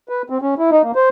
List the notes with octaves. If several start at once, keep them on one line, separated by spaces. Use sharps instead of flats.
B4
C4
C#4
E4
D#4
A#3
C5